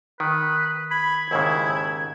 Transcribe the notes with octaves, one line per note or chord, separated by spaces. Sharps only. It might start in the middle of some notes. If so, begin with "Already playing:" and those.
D#3 B4
B5 G#6
D#2 G#2 C#3 E4